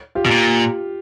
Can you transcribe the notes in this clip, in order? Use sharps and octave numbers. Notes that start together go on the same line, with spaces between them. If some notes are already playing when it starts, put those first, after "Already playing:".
F4 G4
B2
A#2